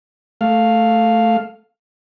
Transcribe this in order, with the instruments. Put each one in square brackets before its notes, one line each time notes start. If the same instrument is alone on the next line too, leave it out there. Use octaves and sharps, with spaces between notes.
[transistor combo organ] A3 F5